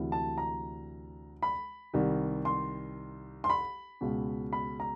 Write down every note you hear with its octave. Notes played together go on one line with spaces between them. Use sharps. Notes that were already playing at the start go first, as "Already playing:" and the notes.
Already playing: D2 C3 E3
A5
A#5
B5
C2 C3 D#3
C6
C6
B5
C#2 B2
B5
A#5